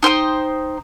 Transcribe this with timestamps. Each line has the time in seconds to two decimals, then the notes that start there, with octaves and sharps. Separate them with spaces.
0.03 D#4 C5 G5 D#6